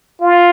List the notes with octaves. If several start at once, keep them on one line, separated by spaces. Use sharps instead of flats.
F4